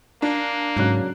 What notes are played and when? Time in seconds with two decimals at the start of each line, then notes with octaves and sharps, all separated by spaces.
0.22 A#3 D4
0.77 G#2 C#3 F#3 F#6